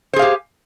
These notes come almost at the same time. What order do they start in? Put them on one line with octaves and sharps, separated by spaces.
C5 G#4 F5 G4